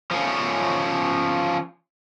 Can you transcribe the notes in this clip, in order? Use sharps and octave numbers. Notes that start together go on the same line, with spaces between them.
F3 C#4